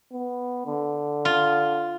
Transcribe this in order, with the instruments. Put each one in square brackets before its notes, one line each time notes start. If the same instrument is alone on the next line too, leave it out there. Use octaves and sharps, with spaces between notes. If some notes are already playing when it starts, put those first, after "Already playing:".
[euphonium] B3
D3
[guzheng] F4